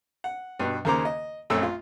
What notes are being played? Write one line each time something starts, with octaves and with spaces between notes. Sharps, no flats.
F#5
G2 B2
D#2 C#3 A#3 C5 A#5 D6
D#5
A#1 F#2 A3 C4 C#5 E6
F4